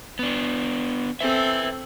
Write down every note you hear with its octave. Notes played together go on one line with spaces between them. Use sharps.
B3 D4
C4 A4 B4 E5